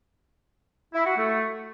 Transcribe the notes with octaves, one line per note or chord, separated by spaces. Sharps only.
E4
F#4
A3